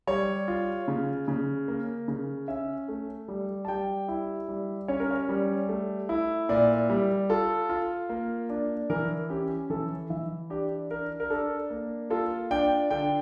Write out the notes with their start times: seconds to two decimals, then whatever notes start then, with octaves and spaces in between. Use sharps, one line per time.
0.07 G3 C#5
0.48 F4
0.88 C#3
1.28 C#3
1.68 A#3
2.08 C#3
2.48 C#4 E5
2.88 A3
3.28 G3
3.65 A5
3.68 G3 G5
4.08 E4
4.48 G3
4.88 C#4 C#5
5.00 A#4
5.11 C#5
5.29 G3
5.69 A3
6.09 E4
6.49 A#2 D5
6.90 G3
7.30 F4 A4
7.69 F4
8.09 A#3
8.49 D4
8.90 E3 A#4
9.30 C#4 G4
9.70 E3 A4
10.10 E3 E5
10.50 D4 G4
10.90 D4 A#4
11.20 A#4
11.30 D4 A4
11.70 A#3
12.10 F4 A4
12.51 D4 G5
12.91 D3 G5